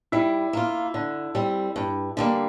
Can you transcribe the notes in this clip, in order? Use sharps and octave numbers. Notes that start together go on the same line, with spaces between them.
G3 E4
A#3 F4
D3
G3 C4
G2
D3 G3 A#3